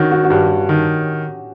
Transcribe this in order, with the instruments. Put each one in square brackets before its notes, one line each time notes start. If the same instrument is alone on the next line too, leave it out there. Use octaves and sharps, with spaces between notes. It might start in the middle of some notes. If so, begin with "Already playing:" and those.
Already playing: [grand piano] D#3 [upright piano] C#4 F#4
[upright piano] F#4
F#4
[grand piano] G2 [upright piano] G4
[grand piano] D#3